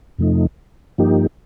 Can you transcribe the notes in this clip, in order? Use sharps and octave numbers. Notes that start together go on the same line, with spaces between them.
F2 C3 F3 A3 D#4
G2 F3 A#3 D#4 G4